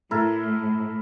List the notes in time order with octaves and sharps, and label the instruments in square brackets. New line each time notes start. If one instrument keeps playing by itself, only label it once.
[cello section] A2 [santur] E4 A4 A#4